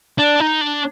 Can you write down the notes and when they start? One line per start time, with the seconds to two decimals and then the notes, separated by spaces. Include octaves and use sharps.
0.18 D4
0.40 D#4
0.61 D4